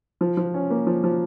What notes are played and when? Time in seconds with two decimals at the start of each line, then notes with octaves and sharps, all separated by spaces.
0.21 F3
0.37 F3
0.54 C#4
0.70 A#3
0.87 F3
1.04 F3